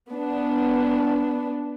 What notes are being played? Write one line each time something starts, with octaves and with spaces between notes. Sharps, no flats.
B3 D4